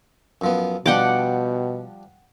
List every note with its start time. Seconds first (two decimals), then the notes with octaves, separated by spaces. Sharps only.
0.41 F#2 F3 B3
0.86 B2 F3 G3 D4 F#5 G5 D6